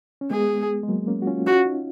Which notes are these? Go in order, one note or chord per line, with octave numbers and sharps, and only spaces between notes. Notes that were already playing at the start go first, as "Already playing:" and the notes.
C#4
G#3 B3 G#4
G#3
F#3 A#3
A#3 C#4
F#4
C#4 F4
C#4 F4 F#4
D#4 F#4